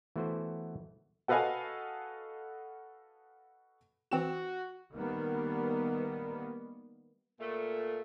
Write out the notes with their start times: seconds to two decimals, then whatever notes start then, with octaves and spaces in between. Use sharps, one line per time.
0.16 E3 A3 B3 F#4 C5
1.28 F#4 A4 B4 D#5 F5 G#5
4.11 E3 C4 F#4 E7
4.94 D#3 G3 A#3 B3
7.40 A#2 A3